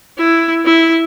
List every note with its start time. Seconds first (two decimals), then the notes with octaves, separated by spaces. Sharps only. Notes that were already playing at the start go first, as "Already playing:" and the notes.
0.18 E4
0.65 E4